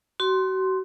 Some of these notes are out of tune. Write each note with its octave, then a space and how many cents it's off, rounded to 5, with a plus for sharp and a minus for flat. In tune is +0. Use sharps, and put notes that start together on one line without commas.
F#4 +35 C6 +0